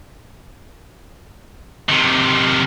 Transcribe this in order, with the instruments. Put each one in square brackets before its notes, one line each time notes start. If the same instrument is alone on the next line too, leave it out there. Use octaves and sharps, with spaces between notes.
[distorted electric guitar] C3 D#3